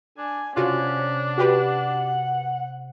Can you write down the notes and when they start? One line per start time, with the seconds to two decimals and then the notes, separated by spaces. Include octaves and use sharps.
0.18 D4 G#5
0.56 C3 C#4 D4 F4 F#4
1.38 F#4 G4 B4 F#5